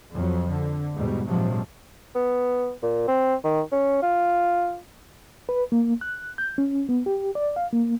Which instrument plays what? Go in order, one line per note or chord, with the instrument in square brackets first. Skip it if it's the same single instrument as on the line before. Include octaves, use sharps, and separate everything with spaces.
[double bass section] F2 F#3
D3
E2 G#2 B2 G3
A#1 G#2 C3 F3 F#3
[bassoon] B3
A#2
C4
D#3
C#4
F4
[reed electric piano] B4
A#3
F#6
G6
C#4
B3
G4
D5
F5
A#3